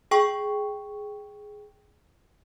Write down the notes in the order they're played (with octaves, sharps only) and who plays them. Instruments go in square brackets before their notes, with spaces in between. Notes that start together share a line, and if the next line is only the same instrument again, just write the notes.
[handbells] G#4 G5 C#6